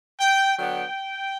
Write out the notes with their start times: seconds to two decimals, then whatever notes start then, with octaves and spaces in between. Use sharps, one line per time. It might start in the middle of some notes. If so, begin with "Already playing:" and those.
0.20 G5
0.57 D3 F#3 B3 G5